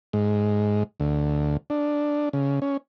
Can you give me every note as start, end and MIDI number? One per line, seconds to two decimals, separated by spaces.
0.13 0.83 44
1.00 1.57 38
1.70 2.29 62
2.33 2.60 49
2.62 2.77 61